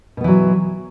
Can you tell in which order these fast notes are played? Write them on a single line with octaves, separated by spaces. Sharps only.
B2 B3 E3 F#3